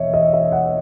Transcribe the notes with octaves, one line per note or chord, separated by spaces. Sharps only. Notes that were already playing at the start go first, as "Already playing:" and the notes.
Already playing: E1 E2 C#5 D#5 E5
D#5
E5
F#5